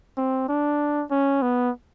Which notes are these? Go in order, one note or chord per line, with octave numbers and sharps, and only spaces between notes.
C4
D4
C#4
B3